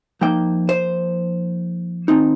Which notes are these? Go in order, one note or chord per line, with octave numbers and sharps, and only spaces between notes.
F3 A#3 D#4 G5
C5
D#3 C4 D#4